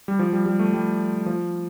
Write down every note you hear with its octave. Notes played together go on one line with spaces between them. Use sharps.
G3
F3
G3
G3
A3
G3
F3